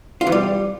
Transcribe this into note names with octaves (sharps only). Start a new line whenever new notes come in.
F4
E3
G3